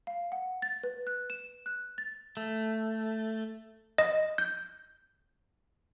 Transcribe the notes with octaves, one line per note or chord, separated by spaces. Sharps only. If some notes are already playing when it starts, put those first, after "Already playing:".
F5
F#5
A6
B4
F#6
E7
F#6
A6
A3
D#5
G6